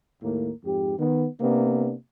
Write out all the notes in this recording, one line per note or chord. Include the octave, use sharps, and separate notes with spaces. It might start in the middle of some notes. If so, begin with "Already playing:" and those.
D#2 A2 A#3
F2 G#2 G4
D#3 B3
C3 A#3 B3 D4